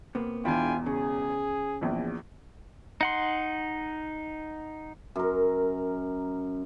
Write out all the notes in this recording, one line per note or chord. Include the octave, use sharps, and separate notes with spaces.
C3 A#3 B3
E1 E2 D4 E4 F4 G5 G#5
C#3 G#4
A#1 E2
D#4 F#5 C6
F#2 A#4